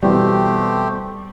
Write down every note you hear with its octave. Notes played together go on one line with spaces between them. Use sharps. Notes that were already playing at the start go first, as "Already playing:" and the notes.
B2 E3 G3 A3 B3 C4 G4